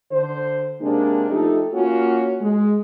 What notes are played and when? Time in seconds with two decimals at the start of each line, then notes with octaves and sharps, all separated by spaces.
0.12 D3 C5
0.81 C3 G#3 A#3 D4
1.30 F3 A3 D#4 G4 A4
1.73 A#3 C#4 F4 F#4
2.41 G#3